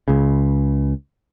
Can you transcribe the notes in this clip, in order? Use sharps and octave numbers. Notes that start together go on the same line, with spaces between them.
C#2 C#3